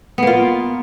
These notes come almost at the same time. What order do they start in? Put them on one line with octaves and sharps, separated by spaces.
B3 A#3 F4